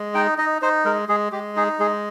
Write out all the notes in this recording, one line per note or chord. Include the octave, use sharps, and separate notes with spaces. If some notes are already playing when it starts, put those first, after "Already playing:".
Already playing: G#3
D#4 G5
D#4 D#5
D#4 C5
G#3 A#4
G#3 G#4
G#3 G4
D#4 G#4
G#3 G#4